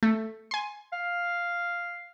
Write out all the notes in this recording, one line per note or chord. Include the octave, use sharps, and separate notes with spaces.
A3
G#5 C6
F5